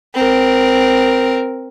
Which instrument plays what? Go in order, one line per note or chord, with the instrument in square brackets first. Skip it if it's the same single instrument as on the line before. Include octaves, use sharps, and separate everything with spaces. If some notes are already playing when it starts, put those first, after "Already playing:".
[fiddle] C4 A#4